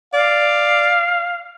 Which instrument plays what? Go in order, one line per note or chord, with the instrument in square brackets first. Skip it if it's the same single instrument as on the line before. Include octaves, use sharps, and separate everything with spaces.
[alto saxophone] D5 [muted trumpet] F5